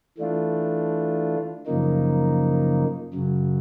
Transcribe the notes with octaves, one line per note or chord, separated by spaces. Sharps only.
E3 A3 D4 F4
F#2 C#3 F3 A#3 D#4
F#2 C#3 F#3